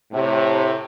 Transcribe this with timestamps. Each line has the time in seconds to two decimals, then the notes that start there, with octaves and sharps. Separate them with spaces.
0.13 A2 C3